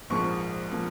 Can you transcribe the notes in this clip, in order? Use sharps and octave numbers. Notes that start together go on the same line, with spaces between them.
A#1 G#2 F3 A#3 C#6
F3 A#3